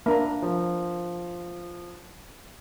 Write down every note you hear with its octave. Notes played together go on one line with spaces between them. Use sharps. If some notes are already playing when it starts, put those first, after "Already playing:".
A#3 D4 E5 A#5
F3